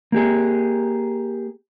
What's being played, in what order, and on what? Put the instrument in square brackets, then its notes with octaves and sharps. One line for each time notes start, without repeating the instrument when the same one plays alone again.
[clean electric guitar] A#3 G4 G#4